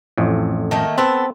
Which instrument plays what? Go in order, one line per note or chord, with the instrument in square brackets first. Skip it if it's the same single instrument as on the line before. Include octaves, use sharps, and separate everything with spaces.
[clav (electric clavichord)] A1 F2 A2
[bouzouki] D#3 A3 A#3
[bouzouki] B3 A4 [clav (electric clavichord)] C4